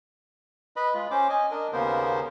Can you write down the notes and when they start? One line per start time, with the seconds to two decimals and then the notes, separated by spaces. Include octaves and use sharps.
0.76 B4 D#5 B5
0.94 G#3 F4
1.11 C#4 C5 D6
1.29 D#5 G#5
1.51 D4 A#4 D#5
1.73 D#2 C#3 A#3 B3 A#4 C5